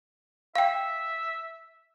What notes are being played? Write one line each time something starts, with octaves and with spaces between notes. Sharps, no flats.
E5 F5 G5